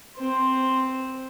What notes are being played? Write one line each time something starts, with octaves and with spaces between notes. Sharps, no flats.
C4 C5